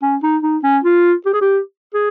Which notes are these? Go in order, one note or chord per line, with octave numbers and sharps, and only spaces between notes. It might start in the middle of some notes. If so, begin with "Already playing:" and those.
C#4
D#4
D#4
C#4
F4
G4
G#4
G4
G#4